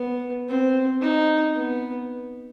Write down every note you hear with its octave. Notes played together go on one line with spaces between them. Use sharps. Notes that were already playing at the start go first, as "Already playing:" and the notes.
Already playing: B3
C4
D#4
B3